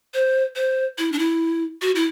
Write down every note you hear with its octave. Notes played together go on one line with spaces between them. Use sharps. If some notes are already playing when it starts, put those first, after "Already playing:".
C5
C5
E4
D4
E4
F#4
E4